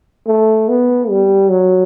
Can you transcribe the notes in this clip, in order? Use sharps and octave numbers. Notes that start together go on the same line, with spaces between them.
A3
B3
G3
F#3